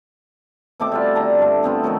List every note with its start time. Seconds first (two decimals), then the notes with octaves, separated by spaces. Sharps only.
0.80 B2 A3 C4 D6
0.92 G3 C4 F4
1.15 D3 A5 A#5
1.39 G2 A3
1.63 A3 B3 C4 F4
1.83 D#3 F3 F#3 A3